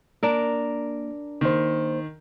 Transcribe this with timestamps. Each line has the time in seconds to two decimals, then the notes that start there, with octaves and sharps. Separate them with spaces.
0.23 A#3 D4 A#4
1.41 D#3 A#3 C5